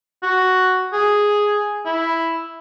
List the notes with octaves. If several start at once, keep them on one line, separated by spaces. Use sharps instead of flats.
F#4
G#4
E4